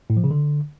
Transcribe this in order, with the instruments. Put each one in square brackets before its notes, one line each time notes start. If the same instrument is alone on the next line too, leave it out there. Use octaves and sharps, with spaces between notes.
[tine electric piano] A2
F3
C#3
D3